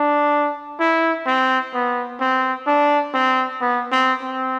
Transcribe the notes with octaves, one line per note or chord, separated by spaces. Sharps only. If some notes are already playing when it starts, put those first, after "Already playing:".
Already playing: D4
E4
C4
B3
C4
D4
C4
B3
C4
C4